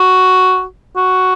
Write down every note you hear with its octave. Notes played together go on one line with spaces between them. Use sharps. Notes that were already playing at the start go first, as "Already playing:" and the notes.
Already playing: F#4
F#4